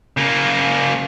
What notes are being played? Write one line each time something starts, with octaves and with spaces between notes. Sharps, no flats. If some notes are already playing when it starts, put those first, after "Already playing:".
C#3 A#3